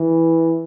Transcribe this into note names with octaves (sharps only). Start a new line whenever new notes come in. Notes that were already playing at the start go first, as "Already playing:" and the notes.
Already playing: E3